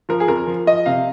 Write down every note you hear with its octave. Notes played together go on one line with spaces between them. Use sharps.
F3 A#4
G#4
F2 A#4
F3
F3 D#5
C3 F5